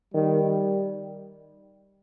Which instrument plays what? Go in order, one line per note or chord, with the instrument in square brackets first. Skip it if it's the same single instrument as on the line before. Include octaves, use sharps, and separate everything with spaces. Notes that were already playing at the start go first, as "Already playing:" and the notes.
[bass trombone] D#3 [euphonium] G3